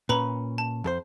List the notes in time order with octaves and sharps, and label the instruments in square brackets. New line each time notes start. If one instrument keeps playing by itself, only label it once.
[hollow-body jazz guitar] A#2 C#4 [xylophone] B4 A#5 B5
[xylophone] A5
[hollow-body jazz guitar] F2 A4 C5